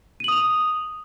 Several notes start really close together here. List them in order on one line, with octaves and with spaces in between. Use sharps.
D#7 F#7 D#6 F7